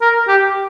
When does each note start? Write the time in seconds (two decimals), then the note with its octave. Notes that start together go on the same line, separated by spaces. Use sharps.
0.01 A#4
0.28 G4